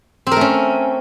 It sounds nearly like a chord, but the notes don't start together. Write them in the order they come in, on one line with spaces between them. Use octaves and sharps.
C4 A#4 A3 C#4